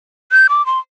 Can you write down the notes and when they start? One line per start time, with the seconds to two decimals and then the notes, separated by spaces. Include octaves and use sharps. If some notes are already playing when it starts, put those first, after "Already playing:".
0.32 G6
0.49 D6
0.66 C6